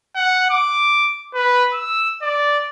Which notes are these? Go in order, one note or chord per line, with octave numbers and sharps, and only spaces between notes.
F#5
D6
B4
E6
D5